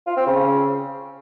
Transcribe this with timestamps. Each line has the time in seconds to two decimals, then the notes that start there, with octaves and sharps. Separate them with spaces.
0.07 F4
0.17 C4
0.27 C#3